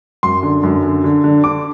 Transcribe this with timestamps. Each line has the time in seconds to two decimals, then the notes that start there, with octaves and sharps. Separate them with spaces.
0.23 F#2 C6
0.43 D3
0.63 F#2
0.83 D3
1.04 D3
1.24 D3
1.44 D3 D6